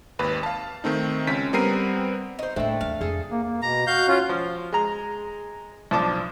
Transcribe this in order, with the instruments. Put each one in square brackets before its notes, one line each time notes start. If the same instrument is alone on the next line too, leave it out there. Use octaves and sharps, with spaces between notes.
[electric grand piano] G#1 D#2 B4
F5 A5
D#3 A3 C4 D#4
C#2 C#4 B6
G3 B3 C4 A#4 C7 D#7
[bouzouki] D#4 C5
[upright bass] A2 A#3 [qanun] A3 D4 [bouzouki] C4 E4
[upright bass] D#2 E3 [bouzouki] F5
[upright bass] F2 [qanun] G#4 A4
[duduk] A#3
A#3
[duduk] B2 [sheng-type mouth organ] A#5
[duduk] F#4 [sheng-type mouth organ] F5 G6
[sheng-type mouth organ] C#4 F4
[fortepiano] F3
G#3 A#5
B1 F3 D4 A5 D6